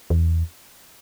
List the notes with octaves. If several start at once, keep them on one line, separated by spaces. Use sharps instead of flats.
E2